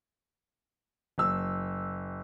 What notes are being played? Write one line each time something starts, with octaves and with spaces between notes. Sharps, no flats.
F#1 E6